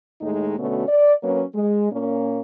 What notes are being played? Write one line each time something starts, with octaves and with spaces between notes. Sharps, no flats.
D#2 A2 G#3 A3 D#4
B2 D3 A3 B3 C#4 F#4
D5
F#3 A#3 C#4 B4 C#5
G#3
A#2 A#3 C#4